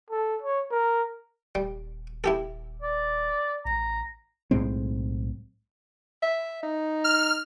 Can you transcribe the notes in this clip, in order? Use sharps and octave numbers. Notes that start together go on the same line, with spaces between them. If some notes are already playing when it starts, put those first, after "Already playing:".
A4
C#5
A#4
D#1 G3
E4 G4 A4
D5
A1 A#5
B1 A2 G#3 C4
E5
D#4
F6